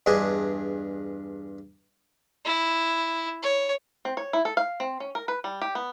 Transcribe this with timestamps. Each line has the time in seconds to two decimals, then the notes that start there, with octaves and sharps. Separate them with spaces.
0.06 E2 G2 D4 G#4 D#5 A5
2.46 E4
3.43 C#5
4.05 C4
4.17 C#5
4.33 E4
4.45 A4
4.57 F5
4.80 C4
5.00 C#4
5.15 A#4
5.28 B4
5.44 G3
5.62 G4
5.75 B3